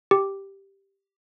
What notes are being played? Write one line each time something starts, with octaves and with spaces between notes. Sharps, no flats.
G4